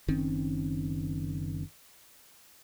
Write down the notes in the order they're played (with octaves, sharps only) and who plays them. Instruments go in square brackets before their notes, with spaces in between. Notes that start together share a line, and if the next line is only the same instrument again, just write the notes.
[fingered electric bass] F#1 D#3 C4 C#4